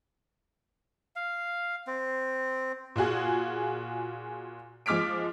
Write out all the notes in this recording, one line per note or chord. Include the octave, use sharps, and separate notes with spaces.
F5
C4
A#2 F4 F#4 G#4
F3 G#3 D6 F6 B6 D7